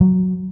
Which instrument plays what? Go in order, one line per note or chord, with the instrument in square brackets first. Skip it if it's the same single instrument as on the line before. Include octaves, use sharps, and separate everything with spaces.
[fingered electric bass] F#3